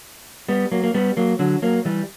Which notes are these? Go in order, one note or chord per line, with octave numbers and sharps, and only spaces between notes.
G3 B3
F#3 A#3
A#3
G3 B3
F#3 A#3
D3 F#3
F#3 A#3
E3 G3